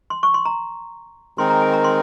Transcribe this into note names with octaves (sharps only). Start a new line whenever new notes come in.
C6
C#6
C6
A#5
D#3 G#3 C4 D#4 A#4 C6
A#5
G#5
A#5
C6